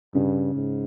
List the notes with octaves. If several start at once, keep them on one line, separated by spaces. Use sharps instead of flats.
G2 C#3
G#2